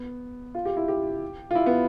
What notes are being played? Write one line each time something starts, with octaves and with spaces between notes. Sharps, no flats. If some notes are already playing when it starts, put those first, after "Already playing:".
Already playing: B3
F4
G4
E4
G4
F4
E4
B3